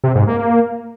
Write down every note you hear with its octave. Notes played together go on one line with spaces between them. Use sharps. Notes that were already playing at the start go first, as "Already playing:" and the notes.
C3
G#2
A#3